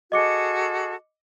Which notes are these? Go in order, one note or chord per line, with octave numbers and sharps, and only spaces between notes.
F#4 G#4 A4 D#5 D6 C#7